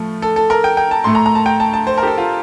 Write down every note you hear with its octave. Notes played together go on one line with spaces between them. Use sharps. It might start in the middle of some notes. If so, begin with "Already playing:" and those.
Already playing: A2 F3 A3
A4
A4
A#4
G5
G5
A5
A2 A3 C6
A#5
A#5
A5
G5
A5
A5
C5
A#4
G4
A4
F4